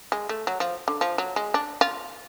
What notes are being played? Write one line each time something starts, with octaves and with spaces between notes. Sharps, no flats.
G#3
A3
F#3
F3
D3
F3
F#3
G#3
D4
F4